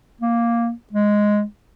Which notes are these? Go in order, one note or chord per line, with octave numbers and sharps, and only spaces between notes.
A#3
G#3